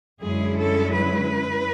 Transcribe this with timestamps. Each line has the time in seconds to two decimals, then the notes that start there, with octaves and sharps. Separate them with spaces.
0.21 F#2 D3 G#3 C#4 E4 G#4
0.58 A4
0.94 B4